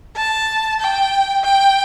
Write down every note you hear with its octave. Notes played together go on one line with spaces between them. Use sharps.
A5
G5
G5